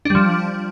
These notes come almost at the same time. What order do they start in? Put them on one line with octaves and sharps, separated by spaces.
D4 G3 F3